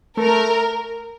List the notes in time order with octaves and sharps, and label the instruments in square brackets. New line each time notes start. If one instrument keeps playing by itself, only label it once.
[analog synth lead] A3 [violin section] A#4